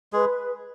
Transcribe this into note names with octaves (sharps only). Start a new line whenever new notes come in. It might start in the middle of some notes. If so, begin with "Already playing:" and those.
G#3 G#4 B4